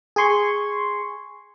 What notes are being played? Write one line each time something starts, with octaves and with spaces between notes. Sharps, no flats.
G#4 G#5 C6 C#6